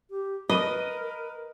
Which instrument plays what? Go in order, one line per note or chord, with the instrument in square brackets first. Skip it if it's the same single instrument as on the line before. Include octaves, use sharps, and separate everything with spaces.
[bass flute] G4
[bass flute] A#4 [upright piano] B4 D#7 [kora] D#5